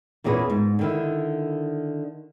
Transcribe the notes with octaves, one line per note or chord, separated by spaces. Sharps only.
E2 A#2 C#4 G#4 A4 B4
G#2
D3 D#3 E4